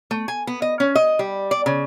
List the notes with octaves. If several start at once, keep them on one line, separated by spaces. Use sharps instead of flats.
A3
G#5
B3
D#5
C#4
D#5
G3
D5
C#3